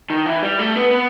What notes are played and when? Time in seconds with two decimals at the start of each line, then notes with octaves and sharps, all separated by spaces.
0.10 D#3
0.26 E3
0.43 G3
0.59 A3
0.75 B3
0.91 B3